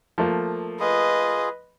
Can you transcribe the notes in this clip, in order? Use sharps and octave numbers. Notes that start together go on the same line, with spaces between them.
F3 A3 A#3
F4 G#4 B4 D#5